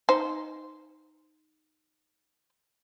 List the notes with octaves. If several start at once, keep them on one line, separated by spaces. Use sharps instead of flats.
D#4 C5